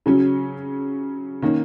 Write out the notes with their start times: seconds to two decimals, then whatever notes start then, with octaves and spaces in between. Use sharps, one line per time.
0.06 C#3 F#3 C#4
1.42 D#3 A#3 C#4